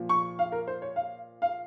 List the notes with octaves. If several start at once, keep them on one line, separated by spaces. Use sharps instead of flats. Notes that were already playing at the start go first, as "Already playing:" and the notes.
Already playing: A#2 F3
C#6
F5
A#4
C5
C#5
F5
F5